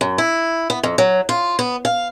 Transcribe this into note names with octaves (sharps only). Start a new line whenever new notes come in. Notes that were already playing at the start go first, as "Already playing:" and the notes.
F#2
E4
B3
F2
F#3
F4
B3
F5